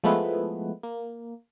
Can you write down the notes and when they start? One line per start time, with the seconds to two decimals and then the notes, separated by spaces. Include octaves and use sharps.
0.04 F3 G#3 A3 B3 E4 B4
0.83 A#3